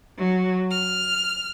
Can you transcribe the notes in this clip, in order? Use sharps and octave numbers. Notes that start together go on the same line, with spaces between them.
F#3
F6